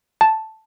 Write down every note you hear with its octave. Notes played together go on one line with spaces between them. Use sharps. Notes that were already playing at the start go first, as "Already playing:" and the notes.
A5